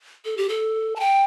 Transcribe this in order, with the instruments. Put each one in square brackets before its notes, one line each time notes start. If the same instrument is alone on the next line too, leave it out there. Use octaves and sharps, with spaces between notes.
[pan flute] A4
G4
A4
A5
G5